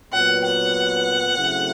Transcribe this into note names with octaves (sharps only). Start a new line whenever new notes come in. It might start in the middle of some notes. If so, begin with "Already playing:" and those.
A#2 F#3 B3 F#5
F#5
C#3 F#3 A3 C4 E4